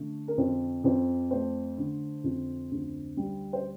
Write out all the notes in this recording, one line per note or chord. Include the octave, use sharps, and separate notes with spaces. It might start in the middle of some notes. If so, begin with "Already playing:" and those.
Already playing: D3 A3
A#4
F2 C5
F2 C5
A3 C5
D3
F2
D2
G3
C5